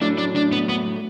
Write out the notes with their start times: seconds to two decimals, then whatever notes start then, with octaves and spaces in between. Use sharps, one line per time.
0.01 A2 F#3 A3 D4 E4
0.18 D4
0.36 D4
0.52 B3
0.69 B3